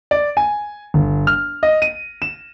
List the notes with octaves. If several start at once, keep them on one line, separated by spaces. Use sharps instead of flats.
D5
G#5
G1
F6
D#5
D#7
E7